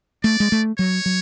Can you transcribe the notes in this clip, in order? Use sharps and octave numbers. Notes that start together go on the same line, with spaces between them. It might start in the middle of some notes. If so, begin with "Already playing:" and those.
A3 D5
G#3
A3
F#3 C#5
F#3